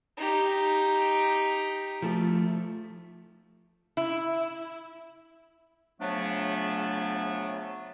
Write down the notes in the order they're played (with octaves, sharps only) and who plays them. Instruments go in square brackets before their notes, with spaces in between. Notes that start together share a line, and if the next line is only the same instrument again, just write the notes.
[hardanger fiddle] D#4 G4
[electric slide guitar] F3 A3
[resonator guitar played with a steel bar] E4
[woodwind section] C#3 F3 F#3 A3 B3 D4